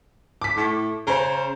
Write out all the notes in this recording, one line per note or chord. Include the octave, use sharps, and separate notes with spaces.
D6 B6
A2
C#3 C5 A#5